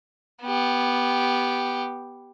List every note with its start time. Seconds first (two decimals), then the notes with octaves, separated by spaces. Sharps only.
0.43 B3 G4